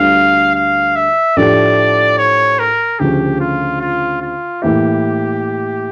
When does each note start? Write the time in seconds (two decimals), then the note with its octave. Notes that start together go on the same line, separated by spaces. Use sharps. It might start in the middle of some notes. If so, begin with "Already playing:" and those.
Already playing: D2 D3 G3 D4 F4 F5
0.55 F5
0.96 E5
1.37 A2 F3 A3 D4 G4 D5
2.18 C#5
2.59 A#4
2.99 D2 C#3 F3 G4
3.40 F4
3.80 F4
4.22 F4
4.62 A2 E3 A#3 E4 G4